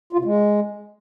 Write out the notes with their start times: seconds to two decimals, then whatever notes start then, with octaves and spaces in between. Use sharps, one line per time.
0.13 F4
0.19 C3
0.25 G#3